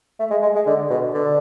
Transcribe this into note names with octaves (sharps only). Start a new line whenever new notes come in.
A3
G#3
G#3
G#3
D3
B2
D3